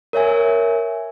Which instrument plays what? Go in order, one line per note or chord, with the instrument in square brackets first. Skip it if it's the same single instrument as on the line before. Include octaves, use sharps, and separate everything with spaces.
[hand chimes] A#4 C#5 E5 G#5